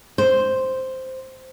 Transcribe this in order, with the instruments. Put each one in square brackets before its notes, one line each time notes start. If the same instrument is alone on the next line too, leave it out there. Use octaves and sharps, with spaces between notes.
[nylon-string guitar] C5